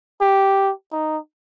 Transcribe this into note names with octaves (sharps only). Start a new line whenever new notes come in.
G4
D#4